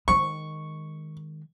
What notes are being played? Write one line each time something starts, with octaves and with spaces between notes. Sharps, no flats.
D#3 G#3 C#6